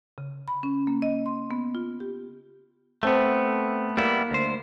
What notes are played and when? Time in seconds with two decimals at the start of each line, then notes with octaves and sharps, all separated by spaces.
0.18 C#3
0.48 B5
0.63 C#4
0.87 A#3
1.02 D#5
1.26 C6
1.51 B3
1.75 F4
2.00 G4
3.03 A3 B3 C4 A4
3.97 G3 A#3 B3 E4
4.31 D2 C5